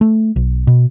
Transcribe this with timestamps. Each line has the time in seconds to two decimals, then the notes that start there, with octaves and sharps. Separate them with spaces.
0.01 A3
0.36 B1
0.67 B2